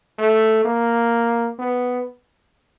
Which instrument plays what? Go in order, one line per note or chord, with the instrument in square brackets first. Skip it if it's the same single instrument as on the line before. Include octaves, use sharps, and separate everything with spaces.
[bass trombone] A3
A#3
B3